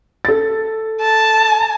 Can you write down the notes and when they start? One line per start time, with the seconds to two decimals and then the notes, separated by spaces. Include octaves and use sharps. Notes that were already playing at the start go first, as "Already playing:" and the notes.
0.25 A4 A6
1.02 A5